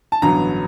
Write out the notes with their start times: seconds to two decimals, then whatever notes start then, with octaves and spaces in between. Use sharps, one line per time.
0.12 A5
0.22 A1 G2 D3 F#3 B3 A#5